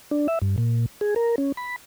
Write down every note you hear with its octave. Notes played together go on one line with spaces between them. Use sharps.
D4
E5
G2
A#2
G#4
A#4
C#4
B5